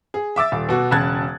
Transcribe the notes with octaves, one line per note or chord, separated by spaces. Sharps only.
G#4
E5 D6 E6 A6
D#1
B2 F#4
E1 C#3 A5 F#6 G#6 A6